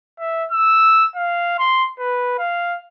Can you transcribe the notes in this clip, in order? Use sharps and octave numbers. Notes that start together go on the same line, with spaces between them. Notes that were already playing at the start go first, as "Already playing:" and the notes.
E5
E6
F5
C6
B4
F5